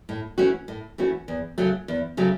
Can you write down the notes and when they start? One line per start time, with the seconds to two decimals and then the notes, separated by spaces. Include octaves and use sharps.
0.09 A2
0.38 E3 A3 C#4 F#4
0.68 A2
0.98 E3 A3 C#4 F#4
1.28 E2
1.58 C#3 F#3 A3
1.88 E2
2.17 C#3 F#3 A3